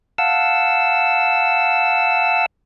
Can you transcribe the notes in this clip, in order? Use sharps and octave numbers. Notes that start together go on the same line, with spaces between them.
F5 F#5 A5 E6